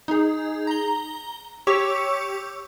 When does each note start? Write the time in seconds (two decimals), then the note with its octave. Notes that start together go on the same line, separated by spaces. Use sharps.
0.08 D#4 G#4
0.67 A#5 G7
1.67 G4 C#5 C#6 D6 E6